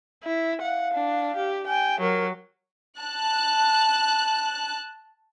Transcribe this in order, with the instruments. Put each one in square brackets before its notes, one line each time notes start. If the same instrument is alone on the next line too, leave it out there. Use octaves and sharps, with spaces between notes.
[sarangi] E4
[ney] F5 [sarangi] F#5
[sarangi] D4
G4
[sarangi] G5 [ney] G#5
[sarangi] F#3 [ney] A#4
[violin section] A5 F#6